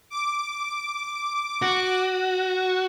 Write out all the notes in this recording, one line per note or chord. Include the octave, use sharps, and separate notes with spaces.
D6
F#4